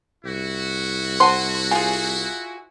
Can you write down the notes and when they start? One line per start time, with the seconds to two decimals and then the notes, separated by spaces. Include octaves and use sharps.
0.25 C2 E4 F#4
1.20 C5 F#5 A5 C6
1.71 F4 G#4 G#5